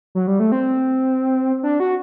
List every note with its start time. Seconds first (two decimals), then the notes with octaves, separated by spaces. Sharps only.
0.15 F#3
0.27 G3
0.40 A3
0.52 C4
1.63 D4
1.80 F#4